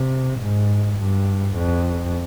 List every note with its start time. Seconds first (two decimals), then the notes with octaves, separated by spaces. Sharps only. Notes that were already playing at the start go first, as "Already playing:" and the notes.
Already playing: C3
0.39 G#2
0.98 G2
1.56 F2